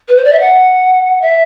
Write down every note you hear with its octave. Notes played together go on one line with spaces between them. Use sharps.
B4
C5
D5
E5
F#5
E5